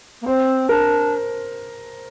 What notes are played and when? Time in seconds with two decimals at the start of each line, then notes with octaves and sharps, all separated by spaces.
0.21 A#3
0.26 C4 C5
0.69 D4 A#4